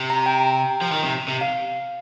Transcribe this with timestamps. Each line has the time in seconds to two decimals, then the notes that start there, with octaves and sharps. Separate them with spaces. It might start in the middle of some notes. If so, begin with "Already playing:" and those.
Already playing: C3
0.10 A#5
0.26 G5
0.81 F3
0.92 D#3
1.04 C3
1.28 C3
1.41 F5